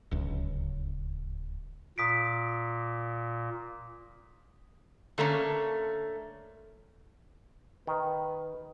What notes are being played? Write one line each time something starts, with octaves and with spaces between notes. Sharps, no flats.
D1 C#2
A#2 D#6 B6 D7
D3 A3 A#3 C#4
D#3 B4